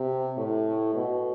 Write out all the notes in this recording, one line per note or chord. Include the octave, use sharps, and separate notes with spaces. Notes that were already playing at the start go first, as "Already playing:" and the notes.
Already playing: C3
A2
B2